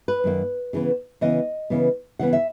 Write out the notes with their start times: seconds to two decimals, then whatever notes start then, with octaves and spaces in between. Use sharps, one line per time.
0.08 B4
0.24 F#2 D#3 A#3
0.73 C#3 E3 B3
1.21 C#3 E3 B3 D#5
1.70 C#3 E3 B3
2.19 C#3 E3 B3 F#5
2.33 E5